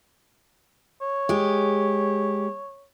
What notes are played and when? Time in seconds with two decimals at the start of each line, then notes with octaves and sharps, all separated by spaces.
1.01 C#5
1.29 G#3 G4